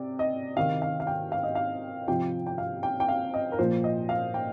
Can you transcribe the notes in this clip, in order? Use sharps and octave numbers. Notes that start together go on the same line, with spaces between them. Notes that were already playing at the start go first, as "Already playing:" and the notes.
Already playing: C3 D5
D#5
C3 D#3 F5
F5
F5
G5
F5
D#5
F5
C3 F3 G5
G5
F5
G5
G5
F5
D#5
A#4
A#2 F3 C5
D#5
F5
G5